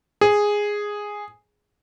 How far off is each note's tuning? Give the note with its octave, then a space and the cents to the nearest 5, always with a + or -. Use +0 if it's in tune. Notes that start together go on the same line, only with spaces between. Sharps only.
G#4 -5